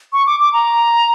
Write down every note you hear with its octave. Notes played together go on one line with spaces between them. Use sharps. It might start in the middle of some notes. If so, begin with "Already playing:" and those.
C#6
D6
D6
A#5